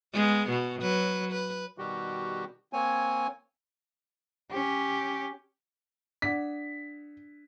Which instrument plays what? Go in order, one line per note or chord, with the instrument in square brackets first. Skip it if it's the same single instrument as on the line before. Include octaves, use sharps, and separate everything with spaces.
[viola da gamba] G#3 B3
B2
F#3 B4
B4
[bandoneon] B2 D#3 G3 F#4 G4
A#3 C4 C#5 G#5
[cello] C#4 G4
[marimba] D4 D5 F#5 [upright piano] B6